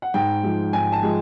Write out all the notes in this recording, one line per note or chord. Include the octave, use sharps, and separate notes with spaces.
F#5
G#2 G5
F3 G#3
G#2 G#5
A5
F3 G#3